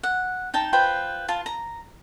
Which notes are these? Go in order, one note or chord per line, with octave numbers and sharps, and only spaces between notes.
F#5
D#4 G5 A5
F4 B4 C5 G5
F4 A5
A#5